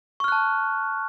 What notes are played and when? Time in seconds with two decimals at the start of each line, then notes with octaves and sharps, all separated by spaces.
0.20 C#6
0.24 F6
0.28 F#6
0.32 A5